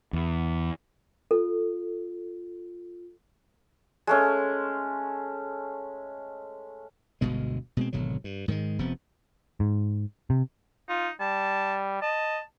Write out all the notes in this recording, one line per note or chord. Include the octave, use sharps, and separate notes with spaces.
E2
F4 A4
G#3 A3 C#4
G1 D2 B2 G#3
B2 G#3 C4
G#1 B2 D3 F#3
G2
G#2 D#3 F#3 G#3
F1 C3 F3 B3
G#2
C3
D#4 F4
G3 A5
D#5 A5